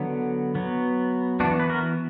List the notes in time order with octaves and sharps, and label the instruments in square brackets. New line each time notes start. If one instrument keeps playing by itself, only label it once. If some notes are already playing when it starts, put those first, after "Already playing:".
Already playing: [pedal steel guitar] D3 F#3 B3
F#3 B3
B3 D4 F#4
E3
B4
F#4 A#4